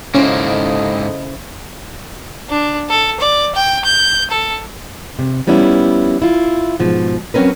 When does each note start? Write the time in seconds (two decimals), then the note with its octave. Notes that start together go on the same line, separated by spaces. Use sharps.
0.14 G#2 C#3 A#3 C#4 E4 A4 C5 D#5
2.50 D4
2.90 A4
3.20 D5
3.55 G5
3.85 G6
4.31 A4
5.19 C3
5.47 F3 G3 B3 C#4 E4
6.22 E4 F4
6.80 G#2 B2 F3
7.34 F#3 C4 C#4 A#4 B4